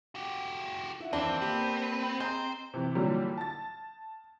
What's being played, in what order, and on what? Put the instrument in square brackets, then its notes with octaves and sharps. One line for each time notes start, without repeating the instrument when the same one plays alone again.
[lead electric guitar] F#4 G4 [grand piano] F#5
[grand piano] E4 F#5
[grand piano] D#2 [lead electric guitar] E3 [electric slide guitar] C4 [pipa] D4
[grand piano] A#3 G4 [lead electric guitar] B3 B4
[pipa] G#3 [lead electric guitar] C5 [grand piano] A#5 G6
[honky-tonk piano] C3 E3
A#2 D3 E3 F#3 G3
A5 A6